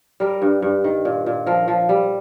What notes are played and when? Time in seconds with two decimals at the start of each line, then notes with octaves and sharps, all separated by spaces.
0.20 G3 A#4
0.42 G2
0.62 G2
0.84 D#3
1.05 A#2
1.26 A#2
1.46 F3 A#4
1.68 F3
1.89 G3